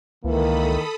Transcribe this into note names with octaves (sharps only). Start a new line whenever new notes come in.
C#2 D#3 E3 A#3 A4 B5 D#6